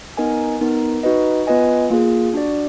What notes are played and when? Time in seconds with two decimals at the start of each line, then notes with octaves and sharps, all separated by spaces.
0.17 B3 D#4 A#4 D#5 G#5
0.61 B3 D#4 A#4
1.03 D#4 F#4 B4 D#5
1.47 B3 F4 B4 D#5 G#5
1.90 A#3 F4 G#4
2.34 D4 F#4 D5